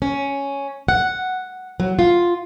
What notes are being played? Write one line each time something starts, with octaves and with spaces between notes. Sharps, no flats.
C#4
F#5
F#3
F4